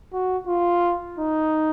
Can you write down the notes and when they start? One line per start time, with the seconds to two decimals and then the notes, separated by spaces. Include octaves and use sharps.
0.13 F#4
0.47 F4
1.18 D#4